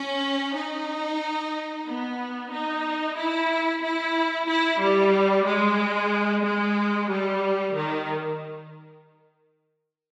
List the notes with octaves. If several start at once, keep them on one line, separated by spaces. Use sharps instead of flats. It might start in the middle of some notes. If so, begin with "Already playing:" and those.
Already playing: C#4
D#4
B3
D#4
E4
E4
E4
G3
G#3
G#3
G3
D#3